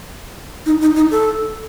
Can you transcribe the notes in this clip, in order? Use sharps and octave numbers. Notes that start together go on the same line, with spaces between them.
D#4
D#4
D#4
A4